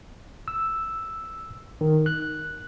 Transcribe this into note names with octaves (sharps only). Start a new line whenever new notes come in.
E6
D#3
F#6